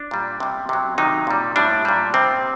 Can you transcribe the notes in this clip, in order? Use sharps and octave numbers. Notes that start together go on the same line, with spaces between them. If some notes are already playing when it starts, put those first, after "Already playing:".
Already playing: D4
A#2 G3
C3 G3
C3 F#3
C3 D#3 F#3 D#4
A#2 G3
A2 G3 D4
A#2 G3
C3 G3 C4